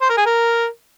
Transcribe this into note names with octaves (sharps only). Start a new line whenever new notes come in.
C5
A#4
G#4
A#4